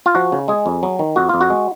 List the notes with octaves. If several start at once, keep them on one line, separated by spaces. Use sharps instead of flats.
F4
F3 F#4
C#3
G#3 G#4
F2
F#3
D#3
F2 F#4
F2 F4
F#4
G#3